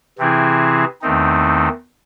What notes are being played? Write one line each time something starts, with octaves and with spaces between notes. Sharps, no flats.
C3 E3 C4 E4 G#4
E2 D#3 A3 C4 D#4